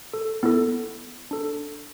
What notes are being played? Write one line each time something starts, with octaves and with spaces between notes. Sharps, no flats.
A4
B3 E4 A4
D4 A4